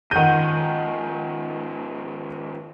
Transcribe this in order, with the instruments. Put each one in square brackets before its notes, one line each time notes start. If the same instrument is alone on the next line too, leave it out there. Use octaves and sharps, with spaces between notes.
[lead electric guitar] G#2 F3 [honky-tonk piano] D#3 D#7 [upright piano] F#5 G6